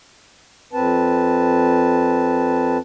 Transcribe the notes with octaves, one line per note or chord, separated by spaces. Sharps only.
F2 C4 B4 A5